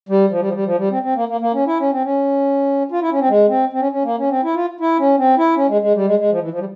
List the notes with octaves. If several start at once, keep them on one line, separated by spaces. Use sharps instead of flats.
G3
F3
G3
F3
G3
F3
G3
C4
C4
A#3
A#3
A#3
C#4
E4
C#4
C4
C#4
F4
E4
C#4
C4
G#3
C4
C4
C#4
C#4
A#3
C#4
C4
E4
F4
E4
C#4
C4
E4
C#4
G#3
G#3
G3
G#3
G#3
F3
E3
F3
G3